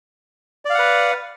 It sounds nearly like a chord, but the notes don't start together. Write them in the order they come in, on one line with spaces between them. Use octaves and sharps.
D5 F5 F#5 B4